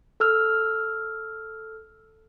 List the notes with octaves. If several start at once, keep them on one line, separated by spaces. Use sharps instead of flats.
A4 E6 F6